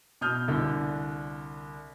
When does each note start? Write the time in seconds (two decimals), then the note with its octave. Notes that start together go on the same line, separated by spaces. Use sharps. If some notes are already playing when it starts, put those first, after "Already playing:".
0.21 B2 D#6 F6 G6
0.48 C2 D3